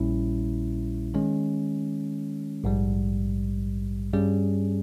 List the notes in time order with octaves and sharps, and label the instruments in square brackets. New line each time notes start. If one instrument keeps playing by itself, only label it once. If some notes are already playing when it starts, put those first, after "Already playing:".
Already playing: [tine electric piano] A#1 A#2 G3 C#4 E4
D#3 G#3 C#4
A#1 G#2 G3
G2 G3 C#4 G#4